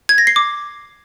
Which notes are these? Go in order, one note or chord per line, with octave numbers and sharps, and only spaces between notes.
G#6
A#6
C7
D6